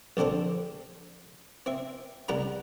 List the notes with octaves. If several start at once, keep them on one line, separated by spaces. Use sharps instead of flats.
A#1 D3 C4 A4 C5
C4 E5
C2 G3 F#5 A#5 B5